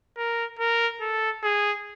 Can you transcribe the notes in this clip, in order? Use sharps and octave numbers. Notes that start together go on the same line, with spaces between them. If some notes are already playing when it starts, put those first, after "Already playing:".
A#4
A#4
A4
G#4